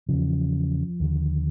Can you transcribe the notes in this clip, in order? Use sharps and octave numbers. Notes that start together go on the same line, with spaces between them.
E2 C#3 F3
D#2 D3